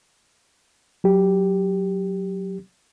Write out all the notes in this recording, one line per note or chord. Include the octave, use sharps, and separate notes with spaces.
F#3 G4